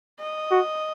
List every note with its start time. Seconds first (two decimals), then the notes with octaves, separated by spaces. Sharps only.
0.19 D#5
0.51 F#4